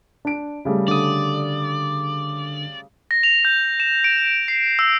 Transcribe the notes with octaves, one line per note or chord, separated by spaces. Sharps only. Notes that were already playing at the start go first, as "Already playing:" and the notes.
D4 D7
C#3 G3 A3
D3 D5 D#6
A#6
F7
G6
E7
D7
C7
E6